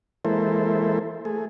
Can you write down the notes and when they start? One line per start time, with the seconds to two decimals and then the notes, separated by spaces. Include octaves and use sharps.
0.25 E3 G#3 A#3 E4 A4 C5
1.25 A3 G#4